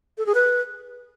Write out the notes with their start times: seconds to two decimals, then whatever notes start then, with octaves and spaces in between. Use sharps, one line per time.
0.18 A4
0.26 G#4
0.34 B4